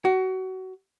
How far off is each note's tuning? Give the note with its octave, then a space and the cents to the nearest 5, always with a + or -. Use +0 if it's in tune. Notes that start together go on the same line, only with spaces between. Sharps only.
F#4 +25